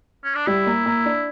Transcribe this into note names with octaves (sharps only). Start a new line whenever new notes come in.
C#4
D4
G3 E4
A#3
A#3
D4